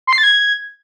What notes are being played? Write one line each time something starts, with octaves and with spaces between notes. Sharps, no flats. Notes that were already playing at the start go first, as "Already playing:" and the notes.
C6
C7
A6
G#6